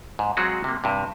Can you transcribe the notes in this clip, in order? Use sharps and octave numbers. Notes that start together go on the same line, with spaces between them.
G#2
F#3 G#3 C4 F4 F#4 G#4
C3 A#3
G2 C3